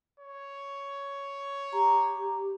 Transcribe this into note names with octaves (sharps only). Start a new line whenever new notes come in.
C#5
G4 A#5